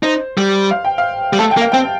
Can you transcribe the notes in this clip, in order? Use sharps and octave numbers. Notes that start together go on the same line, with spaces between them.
D#4 C5
G3
F5
G5
F5
G3
A3 A5
G5
A#3
F5
C4 G5